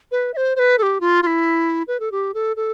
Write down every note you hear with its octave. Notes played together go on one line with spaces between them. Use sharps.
B4
E5
C5
C5
B4
A4
G4
F4
F4
E4
B4
A4
G4
A4
A4